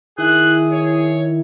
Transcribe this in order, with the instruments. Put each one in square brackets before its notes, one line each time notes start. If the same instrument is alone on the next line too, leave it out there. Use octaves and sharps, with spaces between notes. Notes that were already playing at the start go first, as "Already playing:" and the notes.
[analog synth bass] D#3 [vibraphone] E4 E5 [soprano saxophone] G#4 [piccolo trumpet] F#6
[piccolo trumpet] C#5